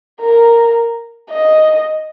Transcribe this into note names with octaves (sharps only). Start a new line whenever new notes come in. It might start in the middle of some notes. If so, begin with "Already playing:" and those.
A#4
D#5